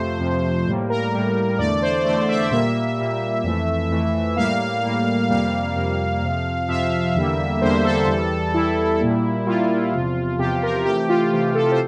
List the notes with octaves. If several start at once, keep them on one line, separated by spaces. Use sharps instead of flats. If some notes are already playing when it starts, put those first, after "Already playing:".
Already playing: F2 C3 F3 A3 C5
F2 C3 F3 A3
A2 G3 A#3
A#4
A2 G3 A#3
E2 D3 A3 D5
C5
E2 D3 A3 D5
E5
A#2 G3 A#3 E5
A#2 G3 A#3
F2 E3 A3
F2 E3 A3
A2 G3 A#3 F5
A2 G3 A#3
F2 C3 G3 A#3 F5
F2 C3 G3 A#3
F2 C3 F3
F2 C3 F3 E5
E2 D3 G3 A#3
E2 D3 G3 A#3 C5
A4
E2 E3 G3
E2 E3 G3 E4
A#2 G3 A#3
A#2 G3 A#3 F4
E2 C3 F3
E2 C3 F3 G4
A#4
C3 E3 A3 G4
F4
C3 E3 A3 G4
A4
C5